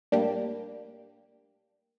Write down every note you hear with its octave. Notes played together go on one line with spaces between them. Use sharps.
A2 G3 A#3 D4